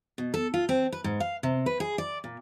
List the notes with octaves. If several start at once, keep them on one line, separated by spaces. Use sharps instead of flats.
B2
A4
F4
C4
B4
G#2
F5
C3
B4
G#4
D5
A#2